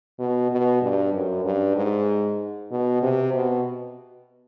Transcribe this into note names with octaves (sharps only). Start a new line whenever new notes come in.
B2
B2
G2
F#2
G2
G#2
B2
C3
B2